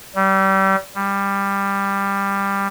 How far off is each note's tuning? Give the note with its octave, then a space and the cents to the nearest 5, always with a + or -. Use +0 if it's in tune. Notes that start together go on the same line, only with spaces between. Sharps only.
G3 -30
G3 +15